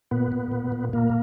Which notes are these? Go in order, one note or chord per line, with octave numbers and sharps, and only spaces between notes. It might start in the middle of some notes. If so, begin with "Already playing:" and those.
A#2 B3
A#2
A#2
A#2
A#2 A#3